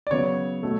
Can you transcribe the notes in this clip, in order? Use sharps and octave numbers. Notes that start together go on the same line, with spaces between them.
D5
C#3 F#3 B3 C#5
B2 F#3 A3